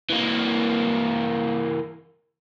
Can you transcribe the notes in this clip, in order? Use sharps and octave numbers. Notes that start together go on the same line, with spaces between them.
E3 A#3